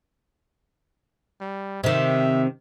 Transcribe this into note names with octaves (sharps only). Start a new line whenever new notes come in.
G3
C3 D#3 E5